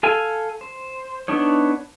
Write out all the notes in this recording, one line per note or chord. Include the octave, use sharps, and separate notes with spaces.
A4 F5 G#5
C5
B3 D4 D#4 C#5